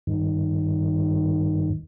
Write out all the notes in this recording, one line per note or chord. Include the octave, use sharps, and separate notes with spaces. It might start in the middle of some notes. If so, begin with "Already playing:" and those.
G2 D#3